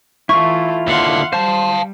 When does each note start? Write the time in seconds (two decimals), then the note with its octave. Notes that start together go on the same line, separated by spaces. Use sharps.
0.29 E3 A3 E4 F4 C#6
0.87 D#2 D3 F5 F#5 C6
1.33 G3 C5 F5 A5